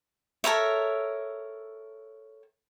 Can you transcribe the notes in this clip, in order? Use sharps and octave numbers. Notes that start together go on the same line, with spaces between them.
A4 A#4 C#5 E5